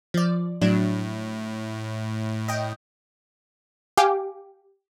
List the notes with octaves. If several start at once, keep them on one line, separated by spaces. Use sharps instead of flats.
F3 D5
A2 F#3 D4
D#5 G5
G4 F5 G#5 D6